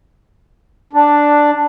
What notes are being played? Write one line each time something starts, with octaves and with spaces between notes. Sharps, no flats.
D4